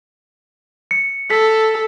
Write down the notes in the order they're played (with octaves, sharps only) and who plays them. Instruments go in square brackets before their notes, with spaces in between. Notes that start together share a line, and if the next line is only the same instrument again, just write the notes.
[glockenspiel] C#7
[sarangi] A4 [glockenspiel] B6